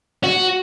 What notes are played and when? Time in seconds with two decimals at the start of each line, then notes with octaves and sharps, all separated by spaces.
0.24 F#4